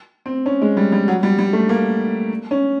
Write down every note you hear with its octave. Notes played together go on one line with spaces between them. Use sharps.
C4
C#4
G#3
G3
G3
F#3
G3
G3
A3
A#3
C#4